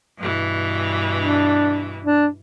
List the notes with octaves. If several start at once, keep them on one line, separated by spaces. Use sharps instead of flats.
G2 B2 E3
D4
D4